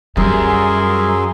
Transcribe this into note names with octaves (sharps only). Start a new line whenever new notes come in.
F#2 G3 G#4 A#4 E5 C6